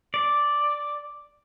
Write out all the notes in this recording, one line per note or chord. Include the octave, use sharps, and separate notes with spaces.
D5